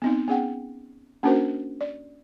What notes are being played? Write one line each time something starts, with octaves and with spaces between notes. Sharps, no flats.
B3 C4 D#4
B3 C#4 G#4 F#5 G5
A#3 C#4 D4 F#4 A#4 C5
D5